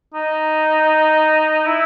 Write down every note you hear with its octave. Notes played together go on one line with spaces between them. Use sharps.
D#4
E4